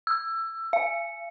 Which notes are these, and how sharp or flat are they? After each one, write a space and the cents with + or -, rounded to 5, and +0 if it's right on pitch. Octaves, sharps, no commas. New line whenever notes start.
E6 +20
F5 -40